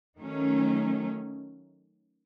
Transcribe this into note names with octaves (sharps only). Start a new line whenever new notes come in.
D#3 F#3 A3 C#4